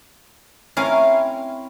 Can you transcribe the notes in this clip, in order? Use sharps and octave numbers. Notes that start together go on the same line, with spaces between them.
C4 C#4 E4 A#4 F5